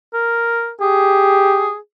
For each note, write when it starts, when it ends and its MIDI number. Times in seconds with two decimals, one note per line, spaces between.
0.14 0.70 70
0.81 1.71 67
0.81 1.76 68